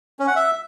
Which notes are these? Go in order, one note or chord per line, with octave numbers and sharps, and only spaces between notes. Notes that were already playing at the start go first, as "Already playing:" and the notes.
C#4
F#5
E5